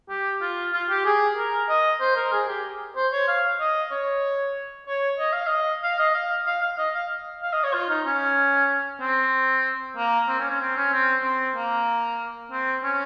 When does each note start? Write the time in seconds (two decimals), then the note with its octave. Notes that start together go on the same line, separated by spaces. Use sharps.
0.09 G4
0.42 F4
0.73 F4
0.89 G4
1.05 G#4
1.37 A#4
1.69 D#5
2.01 C5
2.16 A#4
2.32 G#4
2.48 G4
2.96 C5
3.12 C#5
3.28 F5
3.60 D#5
3.91 C#5
4.87 C#5
5.19 D#5
5.33 F5
5.47 D#5
5.83 F5
5.99 D#5
6.14 F5
6.47 F5
6.62 F5
6.78 D#5
6.95 F5
7.42 F5
7.53 D#5
7.64 C#5
7.74 F4
7.90 D#4
8.06 C#4
9.01 C4
9.97 A#3
10.28 C4
10.39 C#4
10.50 C#4
10.61 C4
10.77 C#4
10.93 C4
11.24 C4
11.56 A#3
12.51 C4
12.84 C#4